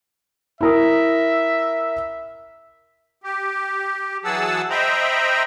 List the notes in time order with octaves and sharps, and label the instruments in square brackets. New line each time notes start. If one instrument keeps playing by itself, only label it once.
[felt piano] E4 A#4 D#6 [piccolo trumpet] E5
[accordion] G4
E3 F#3 G#4 F#5 A5 E6
C5 D#5 E5 G5 A#5 B5